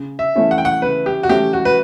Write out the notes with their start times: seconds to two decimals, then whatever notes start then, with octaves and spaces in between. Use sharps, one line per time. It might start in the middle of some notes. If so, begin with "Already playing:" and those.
Already playing: C#3
0.19 E5
0.36 E3 A3 C#4 E4
0.51 F#5
0.58 G5
0.65 F#5
0.82 C#3 B4
1.06 G4
1.23 F#4
1.29 E3 A3 C#4 E4 G4
1.53 F#4
1.65 B4